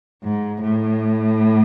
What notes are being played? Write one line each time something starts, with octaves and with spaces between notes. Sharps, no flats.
G#2
A2